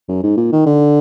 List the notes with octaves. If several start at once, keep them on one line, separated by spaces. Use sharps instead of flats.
F#2
G#2
A#2
D#3
D3